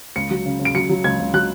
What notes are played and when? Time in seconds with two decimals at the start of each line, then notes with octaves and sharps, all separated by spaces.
0.16 C#2 C#7
0.31 F#3
0.46 C#3
0.59 C#3
0.65 D7
0.75 F#3 C#7
0.89 F#3
1.04 C#2 G#6
1.19 C#2
1.33 F#3 F#6